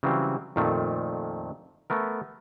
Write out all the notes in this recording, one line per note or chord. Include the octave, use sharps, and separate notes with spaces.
C#3 E3 F#3 G3 C4
F2 A#2 D#3 A3
A3 B3 A#4